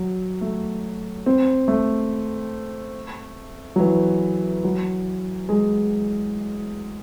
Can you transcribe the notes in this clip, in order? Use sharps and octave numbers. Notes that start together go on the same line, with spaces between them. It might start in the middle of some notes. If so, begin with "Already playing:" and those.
Already playing: F#3
A3
C4
A3
F#3
E3
F#3
G#3